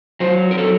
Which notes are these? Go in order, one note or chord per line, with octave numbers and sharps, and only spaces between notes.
F#3 C5
A#4
F#3 A4